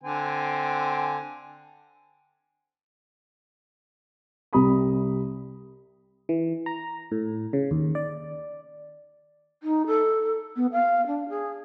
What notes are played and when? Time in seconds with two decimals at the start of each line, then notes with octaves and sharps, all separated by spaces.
0.04 D3 C4 G#5
4.53 C2 C3 G3 A#5 B5 D#6
6.29 E3
6.66 A#5
7.12 A2
7.53 C#3
7.71 D#2
7.95 D5
9.63 D#4
9.87 A4
10.56 B3
10.72 F5
11.07 D4
11.29 G#4